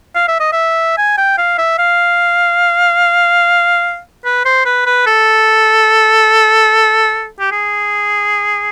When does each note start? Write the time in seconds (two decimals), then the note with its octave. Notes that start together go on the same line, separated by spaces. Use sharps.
0.15 F5
0.28 E5
0.40 D#5
0.52 E5
0.98 G#5
1.18 G5
1.38 F5
1.58 E5
1.78 F5
4.25 B4
4.45 C5
4.65 B4
4.86 B4
5.07 A4
7.40 G4
7.52 G#4